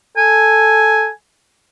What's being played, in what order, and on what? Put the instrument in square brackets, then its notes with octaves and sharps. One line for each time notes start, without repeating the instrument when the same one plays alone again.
[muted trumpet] A4 [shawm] G#5